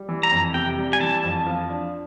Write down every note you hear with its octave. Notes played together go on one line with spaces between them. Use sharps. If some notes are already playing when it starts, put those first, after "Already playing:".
Already playing: G3
E3
A#5
F2
C3 G5
G3
G#5
E3 A5
F2
F3
D4